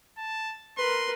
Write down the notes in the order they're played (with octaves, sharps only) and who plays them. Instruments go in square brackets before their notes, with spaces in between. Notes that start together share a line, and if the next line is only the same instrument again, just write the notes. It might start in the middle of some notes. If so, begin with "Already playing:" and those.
[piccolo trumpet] A5
[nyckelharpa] A#4 B4 [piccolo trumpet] C6